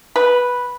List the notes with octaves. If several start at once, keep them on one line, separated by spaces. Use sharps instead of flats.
B4